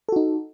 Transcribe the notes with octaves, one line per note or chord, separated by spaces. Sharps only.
D#4 F#4 A4